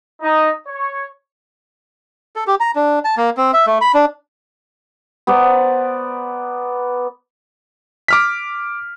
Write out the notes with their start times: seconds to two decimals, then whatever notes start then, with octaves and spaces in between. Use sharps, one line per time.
0.22 D#4
0.67 C#5
2.36 A4
2.47 G4
2.60 A#5
2.75 D4
3.05 A5
3.17 A#3
3.37 C4
3.53 E5
3.67 A3
3.81 B5
3.94 D4
5.27 B3 C5 D5 A#5
8.08 D6 F6 B6